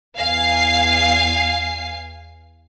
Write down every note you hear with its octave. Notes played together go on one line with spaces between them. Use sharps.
E2 F5 G#5 C7